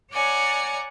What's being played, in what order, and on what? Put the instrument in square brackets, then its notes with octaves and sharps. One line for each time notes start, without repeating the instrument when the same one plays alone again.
[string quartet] C#5 D5 F#5 G#5 A#5